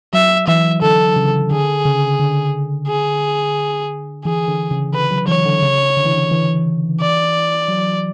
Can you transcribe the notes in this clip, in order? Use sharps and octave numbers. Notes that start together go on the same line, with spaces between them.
F#3 E5
E3 E5
D3 A4
C#3
D3 G#4
C#3
D3
G#4
E3 G#4
D3
C#3
D3 B4
F#3
E3 C#5
D3
C#3
D3
E3
D3
E3
D5
F#3